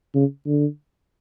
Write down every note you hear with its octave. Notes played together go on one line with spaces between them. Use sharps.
C#3
D3